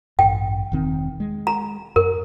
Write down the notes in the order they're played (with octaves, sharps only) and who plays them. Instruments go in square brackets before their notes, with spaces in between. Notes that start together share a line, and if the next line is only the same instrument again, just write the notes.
[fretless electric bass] A1 G2 [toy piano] G5
[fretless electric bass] E1 D#3 C4
G#3
[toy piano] A#5
[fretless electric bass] F#2 [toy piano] A#4